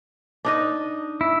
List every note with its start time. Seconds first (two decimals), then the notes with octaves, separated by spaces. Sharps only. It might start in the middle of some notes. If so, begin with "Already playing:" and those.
0.45 D4 D#4 D#5
1.21 E4